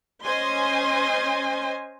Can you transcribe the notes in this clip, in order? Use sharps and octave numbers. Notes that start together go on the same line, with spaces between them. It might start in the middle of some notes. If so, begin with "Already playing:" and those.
C#4 C5 D#5 G#5 C6